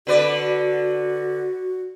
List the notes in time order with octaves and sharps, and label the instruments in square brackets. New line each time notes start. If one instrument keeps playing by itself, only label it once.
[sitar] D3 B4 D5 [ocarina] F#4